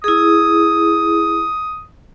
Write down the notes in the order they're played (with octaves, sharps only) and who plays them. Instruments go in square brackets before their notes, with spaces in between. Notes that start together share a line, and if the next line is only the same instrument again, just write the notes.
[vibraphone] E4 G#4 [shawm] D#6